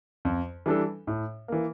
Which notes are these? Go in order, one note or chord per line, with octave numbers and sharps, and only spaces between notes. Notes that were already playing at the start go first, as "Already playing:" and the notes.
F2
E3 G3 D4 A4
A2
E3 A#3